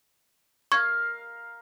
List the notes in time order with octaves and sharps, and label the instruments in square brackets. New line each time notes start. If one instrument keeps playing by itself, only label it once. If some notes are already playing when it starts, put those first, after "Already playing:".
[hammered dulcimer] A#4 F5 [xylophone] C#6 G#6